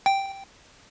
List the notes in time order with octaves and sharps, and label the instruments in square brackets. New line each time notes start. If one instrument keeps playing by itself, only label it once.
[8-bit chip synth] G5